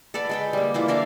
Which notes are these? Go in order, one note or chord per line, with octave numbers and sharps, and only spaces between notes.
A4 B4 D5 F#5
G#3 B4 G5
G3 A#3
E3 A#3 E4 F4
D4 A#4 E5 F5